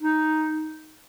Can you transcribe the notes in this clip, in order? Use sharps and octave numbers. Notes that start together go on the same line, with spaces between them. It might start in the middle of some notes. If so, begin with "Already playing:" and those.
D#4